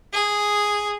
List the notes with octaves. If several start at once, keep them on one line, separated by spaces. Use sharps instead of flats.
G#4